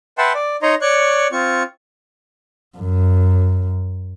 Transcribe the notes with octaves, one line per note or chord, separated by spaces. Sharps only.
B4 E5 F#5 G5 A5 C6
D5
D#4 C#5 D#5 A#5 C6
C#5 D5 C#6 F#6
C4 F4 C#6
F#2